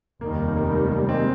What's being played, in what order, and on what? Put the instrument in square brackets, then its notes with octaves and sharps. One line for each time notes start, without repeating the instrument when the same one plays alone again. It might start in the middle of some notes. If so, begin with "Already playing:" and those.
[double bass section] F1 D#2 D#3 G3 [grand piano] A#3
[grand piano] A#3
A#3
G#3 C4